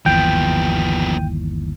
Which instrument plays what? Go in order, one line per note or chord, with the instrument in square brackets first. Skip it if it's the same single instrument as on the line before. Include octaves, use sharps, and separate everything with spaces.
[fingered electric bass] G1 D#2 E3 [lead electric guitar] F3 B3 [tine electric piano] G5